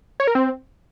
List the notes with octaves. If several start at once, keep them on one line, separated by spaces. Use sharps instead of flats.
C#5
A#4
C4